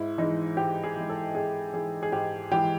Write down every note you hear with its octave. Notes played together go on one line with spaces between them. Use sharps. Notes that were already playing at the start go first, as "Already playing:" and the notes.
Already playing: G#2 E4
E3 G#3 D#4
G#2 G4
G#4
E3 G#3
A4
G#2 G#4
E3 G#3 G#4
G#4
G#2 G4
E3 G#3 G4